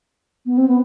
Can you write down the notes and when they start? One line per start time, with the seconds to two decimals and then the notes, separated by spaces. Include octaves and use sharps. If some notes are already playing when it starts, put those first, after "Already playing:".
0.46 B3
0.57 C4
0.68 B3